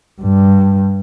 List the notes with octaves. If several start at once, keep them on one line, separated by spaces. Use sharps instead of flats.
G2